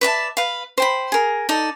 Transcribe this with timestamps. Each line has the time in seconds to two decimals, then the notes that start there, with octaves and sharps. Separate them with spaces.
0.01 B4 D5 E5 A5
0.37 B4 F5
0.78 C5 G5 B5
1.12 G#4 A#4
1.49 D#4 A4 D5